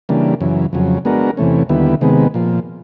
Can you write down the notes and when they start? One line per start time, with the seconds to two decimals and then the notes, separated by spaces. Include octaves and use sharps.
0.09 C#3 E3 G3 A#3 D4
0.41 F#2 C#3 E3
0.73 F2 C#3 F#3
1.05 G#3 B3 D4 F#4 A#4
1.37 E2 C3 E3 A3 C#4
1.69 D#2 D3 G3 B3 E4
2.01 C3 D#3 G#3 B3
2.34 A#2 F3